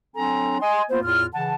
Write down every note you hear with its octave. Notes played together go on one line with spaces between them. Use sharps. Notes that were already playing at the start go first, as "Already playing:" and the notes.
F#3 C4 D4 A4 G#5 A#5
D#5 G#5 C6
A#3 B3 F4 C5
E2 A2 F4 F6
C#3 E3 F#5 A5